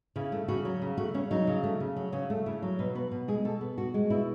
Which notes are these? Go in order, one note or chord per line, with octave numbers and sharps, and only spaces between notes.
C#3 E4
A3
C#3 F#4
F#3
C#3
A3 F#4
C#3 C#4
F#3 D#4
C#3
A3
C#3
F#3
C#3 C#4
A3
C#3 E4
F#3
B2 B4
B3 B4
B2
G#3 G#4
B2 A4
B3
B2 F#4
G#3
B2 E4